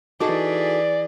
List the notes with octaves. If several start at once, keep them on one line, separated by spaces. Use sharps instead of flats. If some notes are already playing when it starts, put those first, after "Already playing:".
E3 D#4 F#4 G#4 A4 D5